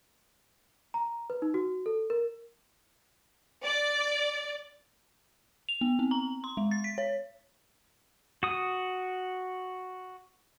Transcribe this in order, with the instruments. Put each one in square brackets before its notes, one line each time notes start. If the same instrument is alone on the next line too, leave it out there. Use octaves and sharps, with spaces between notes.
[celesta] A#5
B4
D#4
F#4
A4
A#4
[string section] D5
[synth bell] F7
B3
C4
A#5
C6
G#3
A6
B6
C#5
[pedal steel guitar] F#4 D#6